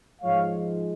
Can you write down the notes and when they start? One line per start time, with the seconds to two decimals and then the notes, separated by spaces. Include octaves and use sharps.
0.22 G#2 F3 G#3 C#5 F5